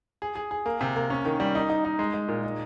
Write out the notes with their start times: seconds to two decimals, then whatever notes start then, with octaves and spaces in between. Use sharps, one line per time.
0.22 G#4
0.36 G#4
0.51 G#4
0.66 A#3
0.81 C3
0.96 A#3
1.10 C#4
1.25 D#3
1.40 G3
1.55 D#4
1.69 D#4
1.85 D#4
1.99 G#3
2.14 G#3
2.28 A#2
2.44 D#4